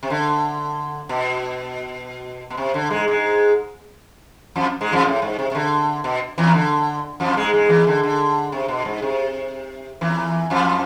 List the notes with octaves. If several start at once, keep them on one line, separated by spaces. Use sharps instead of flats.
C3
D3
B2
B2
C3
D3
G#2 G#3
G#2 G#3
F2 F3
G#2 G#3
F2 F3
A2
G#2
C3
C3
D3
B2
E2 E3
D3
F2 F3
G#2 G#3
G#2 G#3
E2 E3
D3
D3
C3
B2
G#2
C3
E2 E3
F2 F3